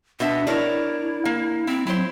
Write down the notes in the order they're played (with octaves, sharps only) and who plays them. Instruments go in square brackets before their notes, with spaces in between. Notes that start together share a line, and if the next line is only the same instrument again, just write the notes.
[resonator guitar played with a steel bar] B2 B3 E5 [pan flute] D4
[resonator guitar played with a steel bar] D4 A#4 C#5 [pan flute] E4
[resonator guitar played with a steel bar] A#3
[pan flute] C4 [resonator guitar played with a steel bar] E4
[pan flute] F#3 [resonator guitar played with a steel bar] E4 C5